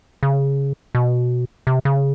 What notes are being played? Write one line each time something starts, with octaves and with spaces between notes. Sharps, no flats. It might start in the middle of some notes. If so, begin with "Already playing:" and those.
C#3
B2
C3
C#3